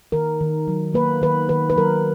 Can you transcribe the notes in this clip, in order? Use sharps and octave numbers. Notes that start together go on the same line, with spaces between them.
D#3 A#4
D#3
F#3
A#3 B4
D#3 B4
D#3 B4
B4
F#3 A#4